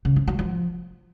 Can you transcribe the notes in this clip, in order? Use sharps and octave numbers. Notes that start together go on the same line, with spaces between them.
C#3
F3
F#3
F3